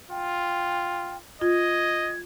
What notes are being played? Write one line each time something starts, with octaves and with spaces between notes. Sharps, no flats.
F4 G5
F4 D#5 G#6